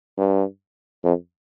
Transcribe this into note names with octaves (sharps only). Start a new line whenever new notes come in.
G2
F2